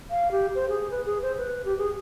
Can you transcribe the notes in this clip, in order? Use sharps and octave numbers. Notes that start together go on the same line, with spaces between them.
F5
G4
C5
G#4
B4
G#4
C5
B4
G4
G#4